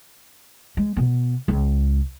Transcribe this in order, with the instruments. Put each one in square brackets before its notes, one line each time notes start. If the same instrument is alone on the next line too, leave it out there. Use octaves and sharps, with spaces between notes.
[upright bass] G#3
B2 B3
C#2